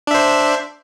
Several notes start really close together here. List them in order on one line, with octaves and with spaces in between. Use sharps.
D4 E5 C5